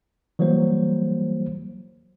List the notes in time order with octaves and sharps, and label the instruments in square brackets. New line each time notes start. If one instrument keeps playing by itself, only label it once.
[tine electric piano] E3 F#3 G3 A#3 C5